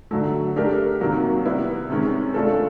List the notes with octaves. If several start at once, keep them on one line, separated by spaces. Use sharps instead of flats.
D3 F#3 A3
A3 D4 G4 A#4
C3 D#3 F#3 A#3
G3 B3 E4
C3 D#3 G#3 C#4
A3 D4 F4 A4